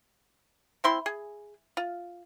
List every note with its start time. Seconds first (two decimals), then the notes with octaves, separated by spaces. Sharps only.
0.84 C4 E4 C6
1.06 G#4
1.77 F4